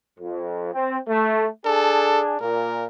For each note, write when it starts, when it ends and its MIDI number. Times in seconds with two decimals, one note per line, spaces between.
0.18 0.71 41
0.72 0.96 60
1.08 1.47 57
1.65 2.36 62
1.65 2.36 68
1.65 2.21 69
2.41 2.86 46
2.41 2.85 70